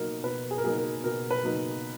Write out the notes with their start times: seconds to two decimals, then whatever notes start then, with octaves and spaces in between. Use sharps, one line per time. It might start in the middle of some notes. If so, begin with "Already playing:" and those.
Already playing: B2 F#3 A#3 D#4 A#4
0.23 B2 B4
0.51 G#4
0.58 A#4
0.64 F#3 A#3 D#4 G#4
0.77 A#4
1.04 B2 A#4
1.31 B4
1.44 F#3 A#3 D#4